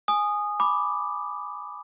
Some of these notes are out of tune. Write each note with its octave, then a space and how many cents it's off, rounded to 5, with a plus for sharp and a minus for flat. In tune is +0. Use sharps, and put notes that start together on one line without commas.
G#5 +0 D#6 -15
B5 +0 D6 +0